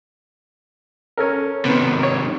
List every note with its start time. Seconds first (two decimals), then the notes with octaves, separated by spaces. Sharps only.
1.17 C#4 A4 A#4
1.65 C3 D#3 B3
2.03 C#5